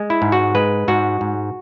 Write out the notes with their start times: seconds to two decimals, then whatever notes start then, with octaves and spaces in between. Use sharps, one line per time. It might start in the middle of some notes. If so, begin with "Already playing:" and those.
Already playing: G#3
0.10 E4
0.22 G#2
0.32 F#4
0.55 G#3 B4
0.88 G#2 F#4
1.21 G#2